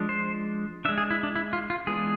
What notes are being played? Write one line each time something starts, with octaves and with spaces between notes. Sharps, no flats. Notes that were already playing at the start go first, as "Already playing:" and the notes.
Already playing: F3 G#3 D4
C5
G#3 D4 E5
G#4
E4
D4
E4
F4
F4
E3 G#3 B3 D4 G#4